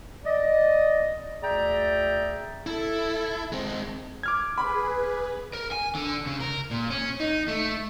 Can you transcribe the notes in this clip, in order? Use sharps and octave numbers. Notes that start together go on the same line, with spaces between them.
D5 D#5
D2 G#4 D5 E5 G5 A#5
E4 A4
G#3 C4
D6 F6 G#6
G#4 B4 B5
A#4
G#5
D3
C#3
A#4
A#2
C#4
D#4
A3